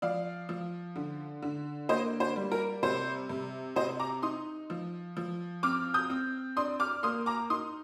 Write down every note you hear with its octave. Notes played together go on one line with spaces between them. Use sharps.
F3 D5 F5
F3
D3
D3
A#3 C5 D#5
C5
G3
A#4
C3 C5
C3
C3 C5 D#5
A#5 D6
D#4 C6 D#6
F3
F3
C4 D6 F6
D#6 G6
C4
D4 C6 D#6
D6 F6
A#3 C6 D#6
A#5 D6
D#4 C6 D#6